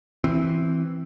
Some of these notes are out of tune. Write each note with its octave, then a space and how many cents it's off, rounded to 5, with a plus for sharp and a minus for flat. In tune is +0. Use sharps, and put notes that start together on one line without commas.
E3 +0 C4 +0